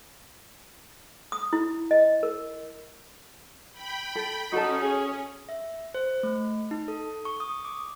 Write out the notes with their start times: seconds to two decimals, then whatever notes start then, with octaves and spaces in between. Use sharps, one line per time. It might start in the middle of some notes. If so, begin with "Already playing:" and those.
1.32 D#6
1.53 E4
1.91 D#5
2.23 A#4
3.73 G5 B5
4.15 A4
4.52 C#4 D#4 F#4 A4 A5
4.82 G#4
5.49 E5
5.94 C5
6.23 A3
6.71 D#4
6.88 A4
7.25 C#6
7.40 D#6
7.65 D6